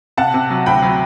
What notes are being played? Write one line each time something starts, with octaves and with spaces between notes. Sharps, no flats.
C3 F#5 A5
C3
F#3
D2 G5 B5
F#3